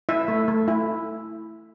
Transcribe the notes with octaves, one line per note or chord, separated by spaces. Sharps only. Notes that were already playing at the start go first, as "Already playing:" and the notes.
E4 E5
A3
A3
E4